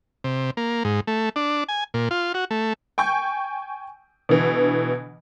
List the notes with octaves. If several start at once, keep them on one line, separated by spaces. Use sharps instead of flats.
C3
A#3
G#2
A3
D4
G#5
A#2
F4
F#4
A3
G5 G#5 C#6 G6
B2 D3 E3